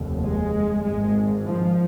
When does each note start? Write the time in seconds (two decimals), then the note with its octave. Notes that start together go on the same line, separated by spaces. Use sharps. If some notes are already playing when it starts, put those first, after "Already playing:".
Already playing: F1 D#2
0.24 G#3
0.83 G#1 G#2 G#3
1.43 F3